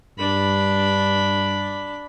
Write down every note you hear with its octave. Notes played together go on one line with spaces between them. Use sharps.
G2 D4 B5